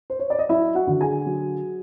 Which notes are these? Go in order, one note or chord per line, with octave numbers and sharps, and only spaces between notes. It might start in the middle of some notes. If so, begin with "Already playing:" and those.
C5
C#5
D5
D#5
F#3 E4 E5
F#4 F#5
D3
G#4 G#5
F#3